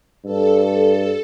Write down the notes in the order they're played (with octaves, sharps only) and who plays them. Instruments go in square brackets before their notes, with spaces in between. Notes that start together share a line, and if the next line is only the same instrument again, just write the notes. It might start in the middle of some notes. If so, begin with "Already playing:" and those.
[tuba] G2 [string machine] A4